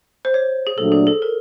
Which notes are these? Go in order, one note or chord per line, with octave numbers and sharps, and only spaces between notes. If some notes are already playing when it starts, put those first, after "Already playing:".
C5
C#5
G#4
A#2 F#3 A3 D4 A4
G#4
A4
A#4